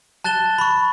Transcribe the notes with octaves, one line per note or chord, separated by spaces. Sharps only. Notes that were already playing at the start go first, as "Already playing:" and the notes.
A5 F#6 A6 E7 G7
B5 C#6